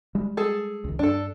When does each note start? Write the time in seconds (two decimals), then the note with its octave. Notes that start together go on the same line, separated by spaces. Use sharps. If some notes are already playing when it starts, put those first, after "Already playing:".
0.15 G3 G#3
0.37 G#4 A4
0.84 C#2 D#3
0.99 G2 D4 A4